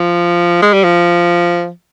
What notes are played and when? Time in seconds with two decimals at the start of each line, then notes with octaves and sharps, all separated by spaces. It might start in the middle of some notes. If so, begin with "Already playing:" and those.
Already playing: F3
0.62 G#3
0.73 G3
0.84 F3